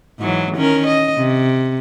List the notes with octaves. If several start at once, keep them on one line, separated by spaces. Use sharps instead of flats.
G#2 E3 F#3
D#3 C#4 A#4
D#5
C3